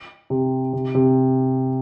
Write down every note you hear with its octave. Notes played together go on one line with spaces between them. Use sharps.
C3
C3
C3